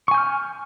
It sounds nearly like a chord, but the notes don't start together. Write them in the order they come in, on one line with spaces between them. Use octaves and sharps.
C#6 G#5 G6 F6